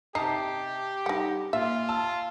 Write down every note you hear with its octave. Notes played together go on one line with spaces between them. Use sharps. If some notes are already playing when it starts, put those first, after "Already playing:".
C3 D#4 G4 A5 C7
G3 D#4 F#5
A#2 F4 E5
A5 E6